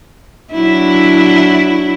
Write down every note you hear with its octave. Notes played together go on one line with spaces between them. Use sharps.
F#3 D4 E4